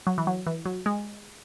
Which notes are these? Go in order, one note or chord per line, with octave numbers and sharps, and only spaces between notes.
F#3
E3
F#3
E3
F#3
G#3